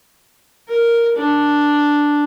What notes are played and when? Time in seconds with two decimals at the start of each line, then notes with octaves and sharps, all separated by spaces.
0.68 A#4
1.17 D4